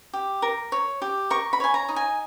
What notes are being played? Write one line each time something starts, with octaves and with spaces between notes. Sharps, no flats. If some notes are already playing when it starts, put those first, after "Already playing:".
G4
A#4
C#5
G4
A#4 C#6
B5
C#5 G#5
A#5
D#4
G#5